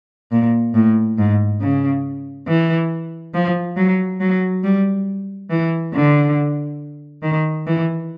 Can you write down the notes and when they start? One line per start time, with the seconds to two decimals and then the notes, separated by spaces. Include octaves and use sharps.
0.32 A#2
0.74 A2
1.18 G#2
1.61 C#3
2.48 E3
3.34 F3
3.77 F#3
4.20 F#3
4.64 G3
5.50 E3
5.94 D3
7.23 D#3
7.66 E3